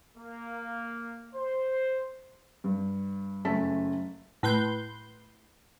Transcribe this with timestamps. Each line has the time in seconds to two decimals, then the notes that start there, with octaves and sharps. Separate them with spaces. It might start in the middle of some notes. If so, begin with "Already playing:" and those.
0.18 A#3
1.35 C5
2.64 G2
3.45 F#1 A3 C#4 A5 B6
4.43 A2 B4 C6 G6